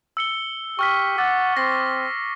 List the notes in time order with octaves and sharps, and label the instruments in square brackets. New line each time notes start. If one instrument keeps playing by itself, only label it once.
[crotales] E6 C#7 G7
[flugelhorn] G4 [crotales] C#6 F6 B6
[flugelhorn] F#5 [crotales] D6 E6 A6
[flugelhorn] C4 [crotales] A#6 C7